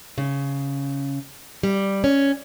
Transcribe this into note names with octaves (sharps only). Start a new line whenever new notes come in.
C#3
G3
C#4